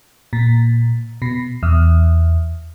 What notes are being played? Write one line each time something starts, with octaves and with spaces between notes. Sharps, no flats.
A#2
B2
E2